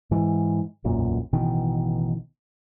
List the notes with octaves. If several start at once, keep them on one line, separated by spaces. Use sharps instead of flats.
G#2 E3
E1 B1 F#2 A#2
A1 B2 D#3 E3